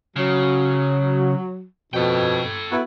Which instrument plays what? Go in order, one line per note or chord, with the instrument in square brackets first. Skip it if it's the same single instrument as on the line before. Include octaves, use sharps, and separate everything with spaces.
[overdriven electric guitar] C#3 [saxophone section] F#3
[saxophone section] F2 B2 [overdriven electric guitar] A4 G5
[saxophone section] B3 E4 F#4